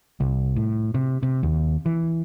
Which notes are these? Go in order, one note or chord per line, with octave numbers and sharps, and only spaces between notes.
C2
A2
C3
C3
D#2
E3